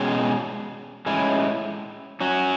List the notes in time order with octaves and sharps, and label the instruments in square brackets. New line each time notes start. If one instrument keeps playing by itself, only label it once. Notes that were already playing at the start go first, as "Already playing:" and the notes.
Already playing: [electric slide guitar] B2 G#3 C#4 G#4
A2 G#3 C#4 E4
F#3 C#4 F#4